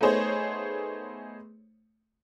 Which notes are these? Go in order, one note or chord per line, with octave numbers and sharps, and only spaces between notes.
A3 B3 D#4 G#4 C5 C#5